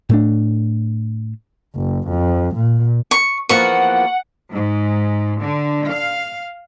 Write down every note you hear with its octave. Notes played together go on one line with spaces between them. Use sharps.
A2 A3 D4
F#1
F2
A#2
C#6
E2 F3 A#3 F#5 C#6
G#2
D3
F5